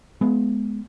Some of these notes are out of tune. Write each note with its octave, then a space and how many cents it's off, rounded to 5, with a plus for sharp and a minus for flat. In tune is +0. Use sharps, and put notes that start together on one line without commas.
G#3 +25 B3 +10